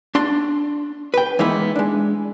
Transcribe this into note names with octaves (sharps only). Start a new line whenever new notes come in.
D4 C6
B4 G5
E3 G#3 A#3 B3 D#4 E4
G#3 D4